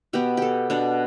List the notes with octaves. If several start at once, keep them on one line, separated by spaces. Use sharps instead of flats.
B2 B3 G4
G4 A4
B2 B3 D4